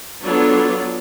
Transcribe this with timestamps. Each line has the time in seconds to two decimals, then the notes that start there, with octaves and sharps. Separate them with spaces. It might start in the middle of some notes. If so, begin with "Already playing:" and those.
0.22 F#3 B3 D4 F4 A4 C#5